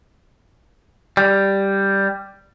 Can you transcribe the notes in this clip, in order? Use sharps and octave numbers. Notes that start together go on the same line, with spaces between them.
G3